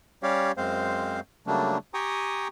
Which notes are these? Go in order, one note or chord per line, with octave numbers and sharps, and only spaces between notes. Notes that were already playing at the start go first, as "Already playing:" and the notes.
G3 C#4 G4 C#5 D5 F5
F#2 G#3 C4 C5 F5
C#3 F#3 G3 A3 A#3 D4
G4 G5 G#5 A#5 C#6 D#6